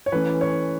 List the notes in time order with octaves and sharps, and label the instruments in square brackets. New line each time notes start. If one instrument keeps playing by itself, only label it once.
[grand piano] C#5
E3 A3 C#4 B4
C#5